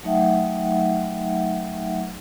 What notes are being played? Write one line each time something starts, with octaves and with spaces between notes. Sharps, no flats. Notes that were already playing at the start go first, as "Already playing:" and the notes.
F#3 A3 D#4 E5 F#5 G5